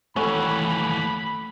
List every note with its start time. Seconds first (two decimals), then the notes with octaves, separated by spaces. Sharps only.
0.16 D#2 E3 A3 C#4 F#4 A4 B5